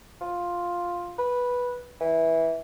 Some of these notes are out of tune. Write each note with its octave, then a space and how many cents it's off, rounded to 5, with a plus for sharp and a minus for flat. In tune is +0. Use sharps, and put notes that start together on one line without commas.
F4 +5
B4 -10
E3 -15